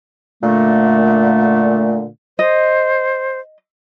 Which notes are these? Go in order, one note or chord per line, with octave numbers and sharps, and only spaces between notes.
A#2 D3 A3
C5 D#5